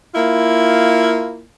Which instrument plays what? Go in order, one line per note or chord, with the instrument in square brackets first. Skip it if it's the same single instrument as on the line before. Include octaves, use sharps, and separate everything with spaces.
[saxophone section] A#3 E4 F4